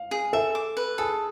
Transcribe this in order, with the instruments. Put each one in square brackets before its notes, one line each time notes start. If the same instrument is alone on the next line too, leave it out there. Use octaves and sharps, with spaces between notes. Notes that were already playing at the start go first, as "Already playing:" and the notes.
Already playing: [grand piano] F5
[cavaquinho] G#4
[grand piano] A4 [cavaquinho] E5
[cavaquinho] D6
B4
[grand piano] G#4 [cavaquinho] A4